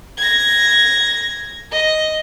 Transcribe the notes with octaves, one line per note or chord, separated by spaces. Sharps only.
G#6 A#6
D#5